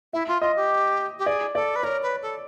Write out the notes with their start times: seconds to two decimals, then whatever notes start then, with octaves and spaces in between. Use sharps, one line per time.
0.13 E4 E5
0.28 F4
0.42 F4 D#5
0.56 G4
1.19 G4
1.26 G#4 D5
1.55 A4 D5
1.76 B4
1.83 A#4 C#5
2.03 B4
2.22 A4